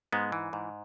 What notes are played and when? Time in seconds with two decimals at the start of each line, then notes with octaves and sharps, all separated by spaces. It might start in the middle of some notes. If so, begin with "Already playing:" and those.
0.13 G#2 G#3 B3
0.32 E3
0.53 G#2